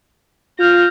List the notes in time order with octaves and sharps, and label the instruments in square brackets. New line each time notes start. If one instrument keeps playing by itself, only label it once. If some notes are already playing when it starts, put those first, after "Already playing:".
[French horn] F4 [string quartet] F6 G6 A#6